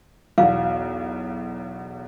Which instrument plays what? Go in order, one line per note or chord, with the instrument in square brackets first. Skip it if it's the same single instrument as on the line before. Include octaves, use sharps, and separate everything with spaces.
[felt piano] B1 E2 F#3 [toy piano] F5